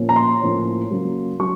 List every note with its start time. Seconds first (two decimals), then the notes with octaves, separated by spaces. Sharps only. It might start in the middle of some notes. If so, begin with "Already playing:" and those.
Already playing: A#2 F3 A#3 C#4
0.09 A#5
0.16 C6
0.41 A2 F3 A#3 C#4
0.91 C#3 F#3 A#3
1.40 F#3 C#4 C#6